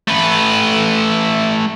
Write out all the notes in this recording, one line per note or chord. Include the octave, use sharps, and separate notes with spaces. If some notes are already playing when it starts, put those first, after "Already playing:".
A3 B4